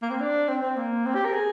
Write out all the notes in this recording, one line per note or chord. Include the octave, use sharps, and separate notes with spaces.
A#3
C4
D4
C4
C4
A#3
C4
G4
A#4
G#4